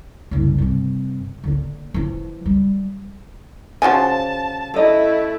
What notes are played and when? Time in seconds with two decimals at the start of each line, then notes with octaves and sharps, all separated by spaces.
0.31 F#1 C2
0.58 G2 C3
1.44 D3 A#3
1.94 E3 F3
2.46 G3
3.82 C#3 F3 F#4 C5 G#5 A5
4.74 A3 E4 A4 D#5